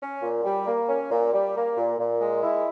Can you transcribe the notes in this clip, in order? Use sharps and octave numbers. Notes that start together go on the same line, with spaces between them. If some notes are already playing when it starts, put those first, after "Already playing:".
C#4
A#2
G3
A#3
C#4
A#2
G3
A#3
A#2
A#2
G#3
E4